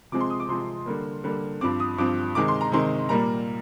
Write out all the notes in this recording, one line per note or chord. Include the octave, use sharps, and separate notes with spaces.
C3 F3 G#3 C4 D6
C6
D#6
D6
C3 F3 G#3 C4 C6
D3 G3 A#3
D3 G3 A#3
G2 F3 C4 D6
D#6
G2 F3 C4 D6
C3 D#3 G#3 D6
C6
A#5
C3 D#3 G#3 C6
A#2 G3 A#3 A#5